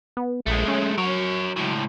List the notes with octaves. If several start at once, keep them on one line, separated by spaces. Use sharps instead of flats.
B3
A#1 G#3 A3
C#4
F#3 A#4 C#5
C#2 A2